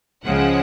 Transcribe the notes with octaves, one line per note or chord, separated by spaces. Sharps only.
C#2 C#3 F3 G#3 F#5